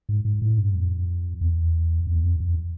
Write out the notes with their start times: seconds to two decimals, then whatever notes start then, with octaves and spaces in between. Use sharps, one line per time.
0.09 G#2
0.25 G#2
0.42 A2
0.58 G2
0.75 F2
1.41 E2
2.07 F2
2.16 E2
2.23 F2
2.40 F2